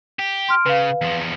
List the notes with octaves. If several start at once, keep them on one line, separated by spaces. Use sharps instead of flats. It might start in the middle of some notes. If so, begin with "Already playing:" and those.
G4
C6 F6 D7
C#3 B4 F5
E2 F3